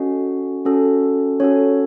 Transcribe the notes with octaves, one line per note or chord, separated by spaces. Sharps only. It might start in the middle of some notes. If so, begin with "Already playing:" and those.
Already playing: C#4 F#4 A4 D#5
C#4 F#4 A4
C#4 F#4 A4 C#5